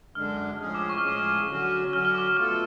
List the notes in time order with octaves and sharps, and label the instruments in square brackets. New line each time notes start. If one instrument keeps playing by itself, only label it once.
[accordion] F#2 D3 G#3 D4 [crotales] F6
[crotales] F6
[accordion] A2 F3 G#3 C#4 G#4 [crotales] F6
[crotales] D6
C#6
F6
[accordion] A2 F3 G#3 C#4 G#4 [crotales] D6
[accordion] D3 F#3 C#4 F#4
[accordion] D3 F#3 C#4 F#4 [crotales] F6
[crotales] F6
D6
[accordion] B2 A3 F4 A4 [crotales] F6